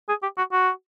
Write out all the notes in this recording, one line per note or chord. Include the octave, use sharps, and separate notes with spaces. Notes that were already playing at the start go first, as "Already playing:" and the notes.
G#4
G4
F#4
F#4